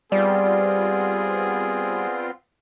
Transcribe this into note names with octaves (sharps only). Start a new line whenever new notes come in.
G3 B3 C4 F4 G#4 D5